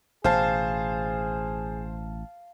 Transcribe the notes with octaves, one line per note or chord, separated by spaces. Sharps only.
A1 B2 G#4 C5 F5 A5